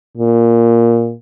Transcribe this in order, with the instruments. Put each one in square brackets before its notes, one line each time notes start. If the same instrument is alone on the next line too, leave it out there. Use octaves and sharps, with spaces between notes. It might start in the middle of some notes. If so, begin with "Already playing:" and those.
[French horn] A#2